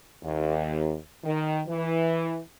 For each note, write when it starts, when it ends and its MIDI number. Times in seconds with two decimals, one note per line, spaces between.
0.23 0.96 39
1.24 1.60 51
1.67 2.39 52